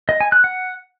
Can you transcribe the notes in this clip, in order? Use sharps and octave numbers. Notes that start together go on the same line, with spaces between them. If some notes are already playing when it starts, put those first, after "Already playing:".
D#5
G#5
F#6
F#5